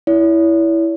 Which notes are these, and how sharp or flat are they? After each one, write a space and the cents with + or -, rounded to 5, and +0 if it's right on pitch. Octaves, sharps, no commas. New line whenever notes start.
E4 +0 C#5 +45